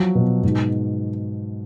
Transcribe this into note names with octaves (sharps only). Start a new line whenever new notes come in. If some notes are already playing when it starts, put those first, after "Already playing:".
Already playing: F3 F#3
B2
G#2